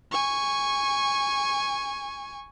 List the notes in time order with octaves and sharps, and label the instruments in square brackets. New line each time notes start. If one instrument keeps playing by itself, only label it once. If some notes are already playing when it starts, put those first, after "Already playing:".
[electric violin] G#5 C#6